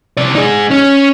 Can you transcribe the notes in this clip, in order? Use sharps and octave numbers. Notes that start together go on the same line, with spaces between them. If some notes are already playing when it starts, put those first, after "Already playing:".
C3 D5
D#4 G#4
C#4